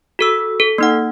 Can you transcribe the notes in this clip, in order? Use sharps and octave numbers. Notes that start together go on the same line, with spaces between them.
F#4 A4 E6
A4
A#3 D#4 F#5